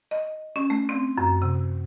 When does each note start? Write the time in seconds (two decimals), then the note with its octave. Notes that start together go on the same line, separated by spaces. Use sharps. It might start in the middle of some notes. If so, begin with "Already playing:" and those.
0.11 D#5
0.56 C#4
0.70 A3
0.89 C4
1.18 F#2
1.42 C3